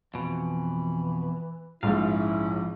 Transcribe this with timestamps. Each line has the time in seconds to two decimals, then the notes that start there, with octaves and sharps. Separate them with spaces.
0.14 F2 B2 E3
1.83 A#1 G#2 F3 C#4 E4 F5